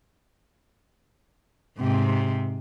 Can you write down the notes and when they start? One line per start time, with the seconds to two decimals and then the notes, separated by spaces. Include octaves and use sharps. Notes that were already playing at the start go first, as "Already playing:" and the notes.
1.79 G#2 C3